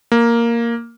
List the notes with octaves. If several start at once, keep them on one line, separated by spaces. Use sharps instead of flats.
A#3